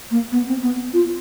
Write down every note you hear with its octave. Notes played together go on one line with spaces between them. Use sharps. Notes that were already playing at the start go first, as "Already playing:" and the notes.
A#3
B3
C4
B3
F4